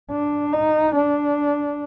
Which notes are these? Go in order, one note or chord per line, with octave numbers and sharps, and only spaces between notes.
D4
D#4
D4